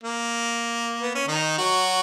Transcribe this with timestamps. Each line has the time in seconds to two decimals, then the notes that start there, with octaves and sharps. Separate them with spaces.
0.03 A#3
1.01 B3
1.15 C#4
1.27 D#3 D#4
1.58 F#3 F#4